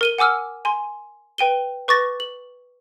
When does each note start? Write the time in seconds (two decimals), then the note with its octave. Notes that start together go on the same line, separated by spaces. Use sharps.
0.01 A#4 D#7 G7
0.18 F#5 G#5 D6 E6 F6
0.65 G#5 C6
1.38 B4 G5 D#7 G7
1.88 B4 C#6 D6 A6 A#6
2.20 F#7